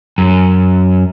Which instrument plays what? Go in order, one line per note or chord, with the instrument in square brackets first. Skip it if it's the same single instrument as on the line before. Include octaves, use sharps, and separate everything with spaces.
[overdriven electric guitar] F#2